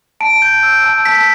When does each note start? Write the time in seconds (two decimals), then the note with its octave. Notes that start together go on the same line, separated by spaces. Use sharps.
0.20 A5 D7
0.42 G6
0.63 E6
0.84 A5
1.05 A5 B6